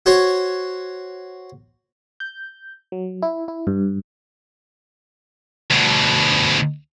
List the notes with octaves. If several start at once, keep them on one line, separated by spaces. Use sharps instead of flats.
F#4 C5 C#5
G6
F#3
E4
E4
G2
D2 B2